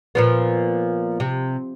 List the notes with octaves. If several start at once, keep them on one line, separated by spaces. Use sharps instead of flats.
A#2 F3 B3
C3